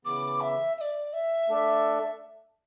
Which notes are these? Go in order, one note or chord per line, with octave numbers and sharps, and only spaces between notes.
C#3 E3 B3 D6
E5
E5
D5
E5
A3 D4 A4 D5